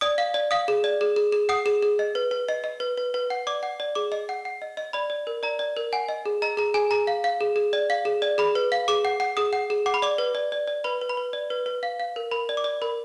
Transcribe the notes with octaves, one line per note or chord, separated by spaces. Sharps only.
D5 D#6
F5
D5
F5 D#6
G#4
D5
G#4
G#4
G#4
F#5 D#6
G#4
G#4
D#5
B4
B4
D#5
D#5
B4
B4
B4
F#5
D5 D6
F#5
D5
G#4 D6
D#5
F#5
F#5
D#5
D#5
D5 B5
D5
A#4
D5 A#5
D5
A#4
F#5 G#5
D#5
G#4
D#5 A#5
G#4 A#5
G#4 G#5
G#4 A#5
F5
F5
G#4
G#4
D5
F5
G#4
D5
G#4 B5
B4
F5
G#4 D6
F#5
F#5
G#4 D#6
F#5
G#4
F#5 D6
B5
D5 D6
B4
D5
D5
D5
B4 B5
B4
B5
B4
D5
B4
B4
F5
F5
A#4
A#4 B5
D5
D6
D5
A#4 B5